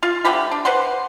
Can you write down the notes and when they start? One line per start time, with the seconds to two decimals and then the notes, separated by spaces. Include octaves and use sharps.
0.03 F4 F5
0.25 D3 A3 G4 B5
0.51 D4
0.65 B4 C5 F#5 C6